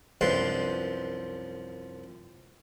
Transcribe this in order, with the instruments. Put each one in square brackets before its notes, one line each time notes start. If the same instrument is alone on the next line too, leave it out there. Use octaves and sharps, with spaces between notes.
[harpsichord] C2 F#2 F3 D4 B4 C6